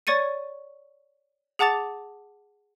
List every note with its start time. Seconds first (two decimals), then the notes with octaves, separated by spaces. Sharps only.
0.07 C#5 D5 C#6 A6 C#7 D#7
1.59 G#4 F#5 A5 D6 A6 F7